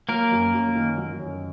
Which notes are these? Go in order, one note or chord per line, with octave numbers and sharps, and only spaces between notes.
F#3 A#3 A#4
F#2
F#2
D#3
F#3
F#2